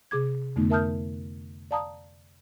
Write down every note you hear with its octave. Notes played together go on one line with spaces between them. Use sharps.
C3 G#4 D6 G#6
F2 D3 A3 B3 D#4
A#4 E5 A5 D#6 F6 G6
D5 F5 A5 A#5 D#6